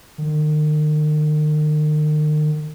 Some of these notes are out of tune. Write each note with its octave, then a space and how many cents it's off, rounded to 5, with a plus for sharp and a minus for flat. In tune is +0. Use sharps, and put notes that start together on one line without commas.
D#3 -40